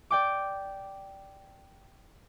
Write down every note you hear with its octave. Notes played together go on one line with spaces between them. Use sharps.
D5 G5 D6